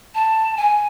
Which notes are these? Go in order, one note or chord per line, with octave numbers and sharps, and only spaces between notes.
A5
G#5